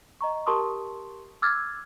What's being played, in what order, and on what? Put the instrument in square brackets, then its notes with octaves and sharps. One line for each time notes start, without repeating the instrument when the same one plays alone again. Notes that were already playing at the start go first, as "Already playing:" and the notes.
[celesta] D#5 A#5 C#6
G4 A#4 A5 C6 C#6 D#6
D6 E6 F6 G#6 A6